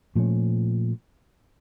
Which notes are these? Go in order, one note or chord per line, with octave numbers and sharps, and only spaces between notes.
A#2 F3 A3 C#4